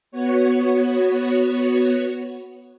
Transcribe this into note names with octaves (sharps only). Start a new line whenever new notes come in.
B3 F#4 C#5